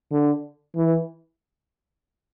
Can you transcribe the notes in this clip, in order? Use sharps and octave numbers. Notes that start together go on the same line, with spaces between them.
D3
E3